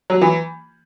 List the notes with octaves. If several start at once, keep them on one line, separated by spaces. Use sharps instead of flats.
F#3
E3